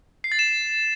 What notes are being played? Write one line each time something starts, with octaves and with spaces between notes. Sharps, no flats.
C7
A6
E7